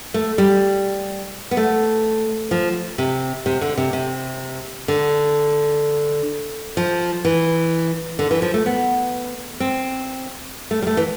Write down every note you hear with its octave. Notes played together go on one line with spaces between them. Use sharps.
A3
G3
B3
A3
F3
C3
C3
D3
C3
C3
D3
F3
E3
D3
E3
F3
A3
B3
C4
A3
G3
A3
E3